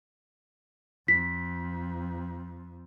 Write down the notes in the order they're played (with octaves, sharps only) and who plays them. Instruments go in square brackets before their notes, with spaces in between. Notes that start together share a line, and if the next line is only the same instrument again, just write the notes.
[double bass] F2 [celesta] B6